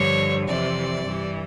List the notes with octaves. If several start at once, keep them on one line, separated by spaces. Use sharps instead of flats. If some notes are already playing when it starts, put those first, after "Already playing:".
Already playing: G2 D3 F3 C#5
F2 C3 E3 D5
G2 E3